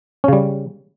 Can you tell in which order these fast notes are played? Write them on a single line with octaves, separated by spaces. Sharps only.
C#4 C#3 G3